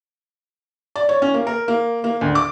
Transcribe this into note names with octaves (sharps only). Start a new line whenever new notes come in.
D5
C#5
C#4
A#3
A#4
A#3
A#3
D2
D6